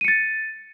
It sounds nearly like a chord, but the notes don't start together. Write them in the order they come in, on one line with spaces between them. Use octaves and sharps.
D#7 C#7 A6